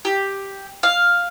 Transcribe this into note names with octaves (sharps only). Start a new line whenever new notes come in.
G4
F5